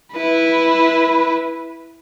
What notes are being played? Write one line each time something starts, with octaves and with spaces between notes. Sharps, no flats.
E4 B4